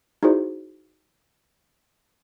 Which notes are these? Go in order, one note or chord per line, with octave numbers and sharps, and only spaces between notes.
D#4 E4 F#4 G#4 C5 D5